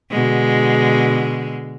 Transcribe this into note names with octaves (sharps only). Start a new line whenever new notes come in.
B2 D3 G#3